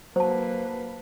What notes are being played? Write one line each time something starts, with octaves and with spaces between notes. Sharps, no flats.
F#3 A#3 B4 C5 A5